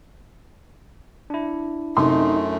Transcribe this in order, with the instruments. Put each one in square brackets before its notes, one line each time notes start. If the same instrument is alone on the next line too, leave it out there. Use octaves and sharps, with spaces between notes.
[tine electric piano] D4 E4
[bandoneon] F#2 A3 [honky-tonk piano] C3 C6 [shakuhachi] D#4